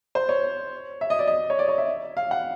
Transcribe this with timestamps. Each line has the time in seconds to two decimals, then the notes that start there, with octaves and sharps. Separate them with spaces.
0.15 C5
0.29 C#5
1.01 E5
1.10 D#5
1.19 D5
1.27 D#5
1.50 C#5
1.59 D5
1.68 C#5
1.78 E5
2.17 F5
2.31 F#5